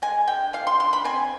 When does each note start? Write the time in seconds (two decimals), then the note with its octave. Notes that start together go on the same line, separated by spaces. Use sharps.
0.02 G#3 G#5
0.28 D3 G5
0.53 F3 F5
0.67 C6
0.80 D3 C6
0.93 B5
1.04 C4 G#5